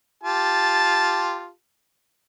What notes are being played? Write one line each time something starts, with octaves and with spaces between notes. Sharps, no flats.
F4 G4 A5